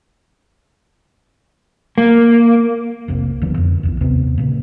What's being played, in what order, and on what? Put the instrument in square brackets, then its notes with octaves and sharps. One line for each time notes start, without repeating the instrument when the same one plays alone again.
[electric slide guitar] A#3
[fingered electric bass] F1 C2 A#3 C4
D#1 D3 F3 B3
F2
A#1 E2
D#2 C3 B3 C4
A#2 C#3 A#3